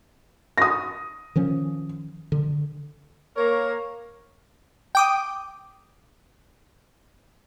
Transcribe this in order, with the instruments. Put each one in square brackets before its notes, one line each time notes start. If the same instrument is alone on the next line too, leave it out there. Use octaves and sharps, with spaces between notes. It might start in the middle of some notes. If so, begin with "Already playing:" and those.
[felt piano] D#6 A#6
[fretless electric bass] D#3 F3 C#4
D3
[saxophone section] A#3 A#4 [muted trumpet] C#5
[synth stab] G5 D6 D#6